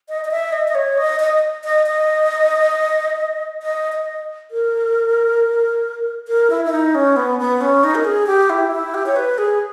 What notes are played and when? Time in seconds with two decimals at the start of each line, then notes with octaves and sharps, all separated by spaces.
0.09 D#5
0.25 D#5
0.31 E5
0.53 D#5
0.68 D#5
0.75 C#5
0.98 D#5
1.20 D#5
1.64 D#5
1.86 D#5
3.62 D#5
3.92 D#5
4.51 A#4
6.28 A#4
6.50 E4
6.65 E4
6.72 D#4
6.95 C#4
7.16 B3
7.39 B3
7.61 C#4
7.84 D#4
7.95 A#4
8.05 G#4
8.27 G4
8.50 E4
8.72 E4
8.94 G4
9.06 C#5
9.16 B4
9.38 G#4